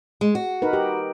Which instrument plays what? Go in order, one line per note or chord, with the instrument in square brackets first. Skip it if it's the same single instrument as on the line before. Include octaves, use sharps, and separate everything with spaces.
[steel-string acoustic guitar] G#3
F#4
[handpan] D#4 A#4 B4
G4